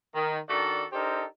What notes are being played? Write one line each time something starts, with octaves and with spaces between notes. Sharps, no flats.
D#3
D#3 D4 F#4 A4 A#4 D5
D4 D#4 G4 A4 A#4 C5